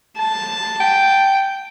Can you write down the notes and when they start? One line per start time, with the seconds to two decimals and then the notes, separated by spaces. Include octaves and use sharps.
0.18 A5
0.80 G5